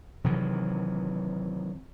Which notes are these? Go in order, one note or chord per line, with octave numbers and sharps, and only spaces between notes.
C3 D#3 E3 F#3